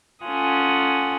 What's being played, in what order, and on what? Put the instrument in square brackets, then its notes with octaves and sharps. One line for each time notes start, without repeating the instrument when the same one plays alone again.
[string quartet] C#4 F4 A4 F#5 G#5 D#6